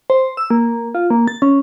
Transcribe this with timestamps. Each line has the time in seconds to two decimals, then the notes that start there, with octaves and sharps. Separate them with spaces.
0.10 C5
0.37 E6
0.50 A#3
0.95 F4
1.10 A#3
1.28 A6
1.42 C#4